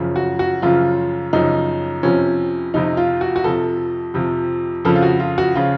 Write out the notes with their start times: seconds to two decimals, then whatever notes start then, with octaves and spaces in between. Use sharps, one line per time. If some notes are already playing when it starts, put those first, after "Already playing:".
Already playing: F#2 C#3 F3
0.16 F#4
0.39 F#4
0.62 F#2 C#3 F3 F4
1.33 F#2 C#3 F3 D#4
2.03 F2 C3 F3 C#4
2.74 F2 C3 F3 D#4
2.97 F4
3.21 F#4
3.36 F#4
3.44 F2 C3 F3 A4
4.14 F2 C3 F3
4.85 F2 C#3 F3 A4
4.95 F4
5.02 F#4
5.20 F4
5.38 F#4
5.55 C#3 F3 F4